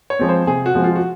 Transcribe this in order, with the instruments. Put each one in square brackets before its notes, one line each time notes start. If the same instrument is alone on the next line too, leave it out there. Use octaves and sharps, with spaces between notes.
[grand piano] C#5
[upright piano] F3 G#3 C4
[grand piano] C5
[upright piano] C3 [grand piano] G#4
[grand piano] F#4
[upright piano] F3 G#3 C4
[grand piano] F4
F#4